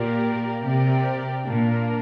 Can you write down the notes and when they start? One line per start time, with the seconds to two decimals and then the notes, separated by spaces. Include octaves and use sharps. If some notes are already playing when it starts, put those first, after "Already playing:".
Already playing: A#2 A#3 G4 A#4 D5
0.63 C3 C4 G4 A#4 D5 G5
1.47 A#2 A#3 D4 A#4